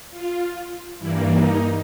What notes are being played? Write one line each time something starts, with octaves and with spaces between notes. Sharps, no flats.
F4
G2 E3 G3 A#3 E4
D#4